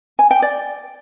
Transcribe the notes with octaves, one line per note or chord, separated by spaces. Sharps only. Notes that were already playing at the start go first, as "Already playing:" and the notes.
G#5
G5
D5